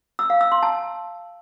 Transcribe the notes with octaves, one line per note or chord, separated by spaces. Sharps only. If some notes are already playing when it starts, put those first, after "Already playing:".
E6
F5
E6
C6
A5